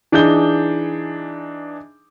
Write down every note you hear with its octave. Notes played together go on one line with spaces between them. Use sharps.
E3 D4 D#4 G#4 G6 G7